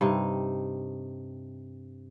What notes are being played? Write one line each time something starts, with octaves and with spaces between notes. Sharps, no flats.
G2 C3 D#4